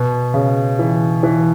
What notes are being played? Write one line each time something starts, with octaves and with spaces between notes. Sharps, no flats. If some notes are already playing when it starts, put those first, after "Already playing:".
Already playing: B2
C#3
E3
E3